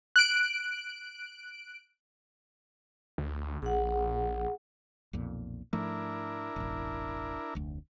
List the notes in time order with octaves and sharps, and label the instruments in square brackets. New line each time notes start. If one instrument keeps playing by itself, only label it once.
[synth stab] F#6 D7
[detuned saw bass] D2
[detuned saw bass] A#1 [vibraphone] G#4 F#5
[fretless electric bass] B1 F2 A#2
[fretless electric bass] G#2 F3 A3 [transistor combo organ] D4 E4 A#4
[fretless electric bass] E1 A1
F1 D2